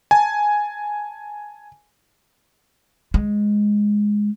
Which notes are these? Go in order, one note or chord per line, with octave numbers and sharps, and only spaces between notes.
G#5 A5
G#3